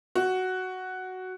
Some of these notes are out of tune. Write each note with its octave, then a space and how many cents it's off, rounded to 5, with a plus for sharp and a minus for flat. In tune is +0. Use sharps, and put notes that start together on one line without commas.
F#4 +5